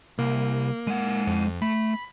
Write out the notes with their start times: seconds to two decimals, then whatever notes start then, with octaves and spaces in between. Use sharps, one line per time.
0.19 C2 A#3
0.87 G#3 F#5
1.27 F2
1.62 A3 B5